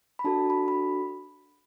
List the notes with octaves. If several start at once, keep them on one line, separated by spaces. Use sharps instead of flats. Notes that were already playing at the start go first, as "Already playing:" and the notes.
B5
D4 F#4 A4 A5
B5
B5